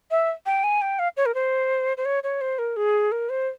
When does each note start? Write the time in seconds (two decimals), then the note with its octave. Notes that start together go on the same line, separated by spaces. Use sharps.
0.11 E5
0.46 G5
0.64 G#5
0.82 G5
0.99 F5
1.17 C#5
1.26 A#4
1.34 C5
1.97 C5
2.05 C#5
2.23 C#5
2.41 C5
2.58 A#4
2.76 G#4
3.12 A#4
3.29 C5